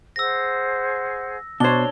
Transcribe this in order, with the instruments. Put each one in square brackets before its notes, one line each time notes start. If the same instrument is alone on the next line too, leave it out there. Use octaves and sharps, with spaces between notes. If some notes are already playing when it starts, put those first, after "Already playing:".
[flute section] G#4 C5 F#5 [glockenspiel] E6 A#6
[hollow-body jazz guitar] B2 C5 [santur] D4 C#5 [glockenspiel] G7